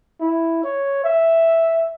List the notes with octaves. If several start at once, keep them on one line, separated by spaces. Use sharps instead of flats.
E4
C#5
E5